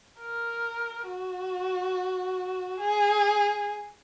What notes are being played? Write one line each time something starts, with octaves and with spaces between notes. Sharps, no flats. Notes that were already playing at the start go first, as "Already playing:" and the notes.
A#4
F#4
G#4